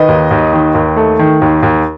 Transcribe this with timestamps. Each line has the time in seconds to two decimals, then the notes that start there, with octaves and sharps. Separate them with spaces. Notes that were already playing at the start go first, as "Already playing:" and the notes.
Already playing: D#3 B4 D#5
0.08 D#2
0.31 D#2
0.53 D#3
0.74 D#2
0.96 A3
1.19 D#3
1.42 D#2
1.63 D#2